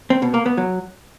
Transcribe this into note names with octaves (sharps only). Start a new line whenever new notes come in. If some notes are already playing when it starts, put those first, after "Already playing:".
C4
B2
A#3
B3
F#3